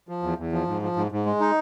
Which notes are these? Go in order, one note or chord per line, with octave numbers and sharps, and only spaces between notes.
F3
E2
E2
F3
G#2
F3
G#2
G#2
G#3
D#4